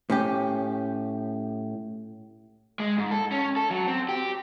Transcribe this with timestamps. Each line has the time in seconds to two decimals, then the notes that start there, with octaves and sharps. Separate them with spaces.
0.10 A2 C#4 G4
2.80 G#3
2.98 G#2
3.11 A4
3.32 C#4
3.56 A4
3.70 F#3
3.87 C4
4.09 G4